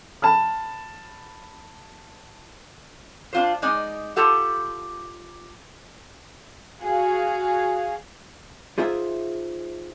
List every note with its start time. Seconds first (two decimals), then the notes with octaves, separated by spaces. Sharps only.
0.22 A5 B5 F6
3.33 D4 F4 C5
3.62 G#3 D#4 D5 D#5
4.16 F4 G4 A4 F#5
6.80 F#4 G#4 F5
8.78 D#4 F4 G#4 C5 E5